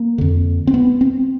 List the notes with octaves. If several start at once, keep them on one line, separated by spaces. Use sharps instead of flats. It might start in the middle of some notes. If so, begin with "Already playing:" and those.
Already playing: A#3
F2 D3
C4
B3
C4